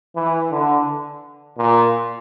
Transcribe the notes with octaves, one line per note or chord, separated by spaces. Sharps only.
E3
D3
A#2